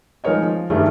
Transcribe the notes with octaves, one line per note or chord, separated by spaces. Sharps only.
F3 G#3 D#4 A#4 C#5 D#5
F3
G2 D#3 E3 G3 A3